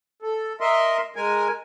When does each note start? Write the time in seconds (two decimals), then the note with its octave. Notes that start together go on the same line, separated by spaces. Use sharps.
0.22 A4
0.60 A#4 D#5 E5 C6
1.16 G#3 A#4 G#5